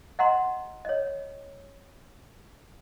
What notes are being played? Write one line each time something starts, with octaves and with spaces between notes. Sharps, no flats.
D#5 F#5 A#5 C6
C#5 D#5